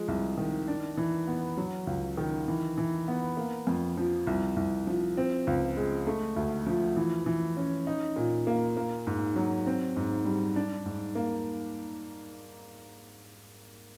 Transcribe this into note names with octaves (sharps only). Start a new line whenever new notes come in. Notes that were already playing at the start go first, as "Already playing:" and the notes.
Already playing: F3 G#3
C2
D#3
D4
E3
B3
F#3
C#2
D#3
E3
E3
B3
A#3
F2
F3
C2
C2
F3
C4
C#2
G#3
A3
D2
F3
E3
E3
C#4
D#4
A#2
A#3
A#3
G#2
F#3
C4
G#2
G3
D4
G#2
A#3